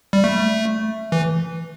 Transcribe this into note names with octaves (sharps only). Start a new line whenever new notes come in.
G3
A3
E3